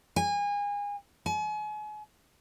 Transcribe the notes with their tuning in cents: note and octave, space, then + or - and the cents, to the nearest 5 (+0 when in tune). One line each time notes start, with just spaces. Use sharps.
G#5 -30
G#5 +35